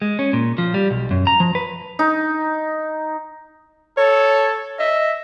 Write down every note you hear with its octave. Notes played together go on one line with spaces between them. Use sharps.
G#3
C#4
A#2
F3
G3
B1
F#2
A#5
F3
B4
D#4
A4 C#5
D#5 E5